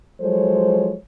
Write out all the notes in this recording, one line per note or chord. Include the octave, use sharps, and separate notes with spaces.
F3 F#3 G#3 A4 C5 C#5